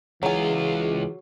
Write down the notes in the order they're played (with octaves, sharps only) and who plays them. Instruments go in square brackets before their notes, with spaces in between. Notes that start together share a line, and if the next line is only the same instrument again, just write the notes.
[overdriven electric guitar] C#2 F4 [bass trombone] E3 [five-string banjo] F#3 G#5 [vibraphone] G#4